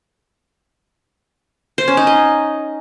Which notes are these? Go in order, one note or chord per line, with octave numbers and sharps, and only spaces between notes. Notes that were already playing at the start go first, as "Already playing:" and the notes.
C5
C#4
D#4
D#5